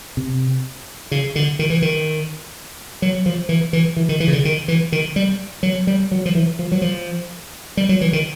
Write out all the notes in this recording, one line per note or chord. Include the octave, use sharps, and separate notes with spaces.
C3
C#3
D3
D#3
E3
D#3
F#3
F3
E3
E3
E3
D#3
E3
C#3
D3
D#3
E3
D#3
G3
F#3
G3
F#3
F3
E3
F3
F#3
F3
G3
F#3
E3
D#3